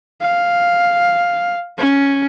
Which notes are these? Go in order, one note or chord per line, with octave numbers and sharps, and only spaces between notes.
F5
C#4